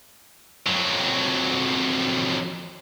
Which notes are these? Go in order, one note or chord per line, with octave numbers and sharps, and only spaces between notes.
F2 F#3